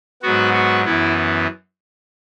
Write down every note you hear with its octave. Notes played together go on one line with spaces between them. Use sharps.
G#2 F#3 B3 F#4
F#4
F#2 E3 B3 E4